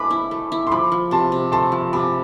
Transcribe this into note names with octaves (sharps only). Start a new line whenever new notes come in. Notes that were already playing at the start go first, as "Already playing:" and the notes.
Already playing: A3 B4 B5 D6
E4
A3
E4
C6
F3 B5 D6
F3
C3 A5 C6
C3
A3 A5 C6
F3
C3 B5 D6